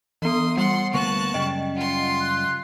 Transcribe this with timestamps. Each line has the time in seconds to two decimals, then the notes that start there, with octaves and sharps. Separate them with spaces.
0.22 E3 B3 C6 D#6
0.57 G3 F#5 C6
0.94 D2 A#3 B3 A5 C#6 F#6
1.34 F#2 C#3 G3 D#5 G5
1.76 F4 F#5 C6
2.20 F#6